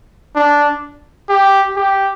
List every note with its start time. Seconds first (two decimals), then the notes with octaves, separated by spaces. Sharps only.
0.36 D4
1.29 G4
1.76 G4